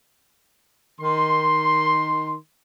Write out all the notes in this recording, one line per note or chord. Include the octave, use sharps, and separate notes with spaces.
D#3 C6